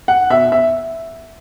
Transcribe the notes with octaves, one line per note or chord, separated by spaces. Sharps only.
F#5
B2 E5
E5